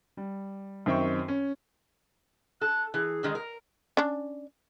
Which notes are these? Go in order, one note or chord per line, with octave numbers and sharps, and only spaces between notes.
G3
F#2 D#3 C4 E5 G5 C#6
C#4
A4 F#6
E3 G#4
D3 D#3 G#3
A#4
C#4 D4